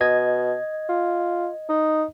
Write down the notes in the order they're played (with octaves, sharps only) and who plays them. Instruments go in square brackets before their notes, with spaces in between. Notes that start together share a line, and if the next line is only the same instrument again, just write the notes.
[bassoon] B2 [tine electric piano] D#5 G#6
[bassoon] F4
D#4